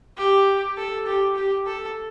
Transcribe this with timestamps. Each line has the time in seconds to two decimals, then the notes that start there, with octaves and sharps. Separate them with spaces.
0.17 G4
0.77 A4
1.06 G4
1.36 G4
1.66 A4